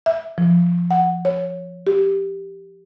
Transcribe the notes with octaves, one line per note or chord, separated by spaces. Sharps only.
E5
F3
F#5
C#5
G4